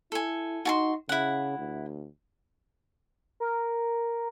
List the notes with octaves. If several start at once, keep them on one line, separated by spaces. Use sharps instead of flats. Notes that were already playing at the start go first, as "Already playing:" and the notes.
E4 A4 G#5
D#4 F#4 A5 C6
C#3 E4 F#5
D2
A#4